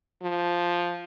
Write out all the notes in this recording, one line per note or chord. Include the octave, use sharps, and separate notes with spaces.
F3